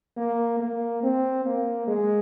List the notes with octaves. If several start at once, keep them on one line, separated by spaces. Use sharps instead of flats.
A#3
A#3
C4
A#3
G#3